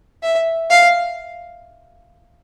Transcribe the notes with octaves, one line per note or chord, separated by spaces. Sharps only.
E5
F5